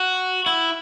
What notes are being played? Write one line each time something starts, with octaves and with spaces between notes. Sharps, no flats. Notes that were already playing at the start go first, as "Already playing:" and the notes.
Already playing: F#4
E4